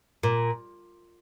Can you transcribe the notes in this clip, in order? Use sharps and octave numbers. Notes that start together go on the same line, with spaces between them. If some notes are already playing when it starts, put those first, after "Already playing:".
A#2